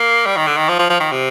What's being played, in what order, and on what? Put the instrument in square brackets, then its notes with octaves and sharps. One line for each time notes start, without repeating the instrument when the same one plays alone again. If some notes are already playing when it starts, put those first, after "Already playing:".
Already playing: [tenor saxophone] A#3
G3
D#3
D3
D#3
F3
F3
F3
D#3
C3